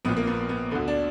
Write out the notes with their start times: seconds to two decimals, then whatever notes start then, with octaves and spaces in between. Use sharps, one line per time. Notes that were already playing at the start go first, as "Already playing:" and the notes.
0.05 A#1 B3
0.09 A#2
0.17 A#3
0.27 B3
0.49 B3
0.71 D2 D3 B3
0.88 D4